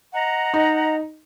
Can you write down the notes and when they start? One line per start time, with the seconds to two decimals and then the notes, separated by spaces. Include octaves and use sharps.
0.13 D#5 F#5 A#5
0.54 D#4